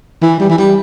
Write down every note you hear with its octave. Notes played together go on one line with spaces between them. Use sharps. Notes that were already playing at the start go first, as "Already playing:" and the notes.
E3
G3
E3
G3